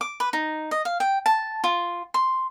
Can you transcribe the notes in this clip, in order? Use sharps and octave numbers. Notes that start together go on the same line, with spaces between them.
D6
B4
D#4
D#5
F5
G5
A5
F4
C6